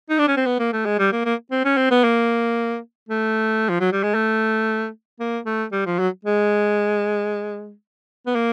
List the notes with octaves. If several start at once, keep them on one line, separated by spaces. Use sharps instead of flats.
D#4
D4
C#4
C4
B3
A#3
A3
G#3
G3
A#3
A#3
C4
C#4
C4
B3
A#3
A3
F3
F#3
G3
G#3
A3
A#3
A3
G3
F3
F#3
G#3
B3
A#3